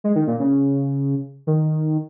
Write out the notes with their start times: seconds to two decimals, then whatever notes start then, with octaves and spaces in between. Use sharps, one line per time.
0.04 G#3
0.16 D#3
0.27 A#2
0.40 C#3
1.47 D#3